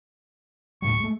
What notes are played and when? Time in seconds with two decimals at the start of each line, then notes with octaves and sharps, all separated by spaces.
0.82 D1 A2 G3 C#6
1.00 G#3 A3